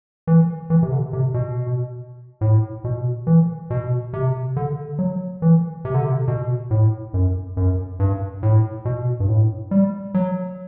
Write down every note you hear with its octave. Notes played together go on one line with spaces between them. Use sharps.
E3
E3
C3
D3
C3
B2
A2
B2
E3
B2
C3
D3
F#3
E3
C3
D3
C3
B2
A2
F#2
F#2
G2
A2
B2
G2
A2
G3
F#3